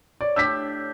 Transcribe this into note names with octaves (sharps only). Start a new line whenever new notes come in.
C#5 D5
A2 D4 G4 E6 B6